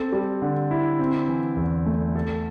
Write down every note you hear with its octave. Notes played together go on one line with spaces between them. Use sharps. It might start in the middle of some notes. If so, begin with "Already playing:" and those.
Already playing: C4 A4
G3
D3
E4
C4
E3
E2
A3
A4